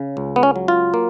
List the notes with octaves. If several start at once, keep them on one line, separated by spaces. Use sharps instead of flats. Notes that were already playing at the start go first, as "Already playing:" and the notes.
Already playing: C#3
C#2
B3
C#4
F#3
F4
A#3